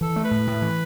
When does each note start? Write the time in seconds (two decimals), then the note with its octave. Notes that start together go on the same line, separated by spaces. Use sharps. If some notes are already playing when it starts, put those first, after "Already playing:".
0.01 E3 A4
0.16 A3
0.24 B4
0.31 A2
0.47 A2
0.62 E3